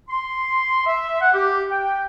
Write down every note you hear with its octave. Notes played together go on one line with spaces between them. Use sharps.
C6
E5
F#5
G4
G5